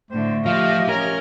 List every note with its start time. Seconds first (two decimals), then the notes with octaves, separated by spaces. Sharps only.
0.11 A2 D3 A3 C5
0.46 F3 G4 D#5 F5
0.89 C#4 A#4